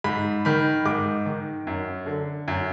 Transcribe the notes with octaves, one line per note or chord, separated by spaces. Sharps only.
G#2 B5
D#3 B5
G#2 D6
D#3
F#2
D3
F#2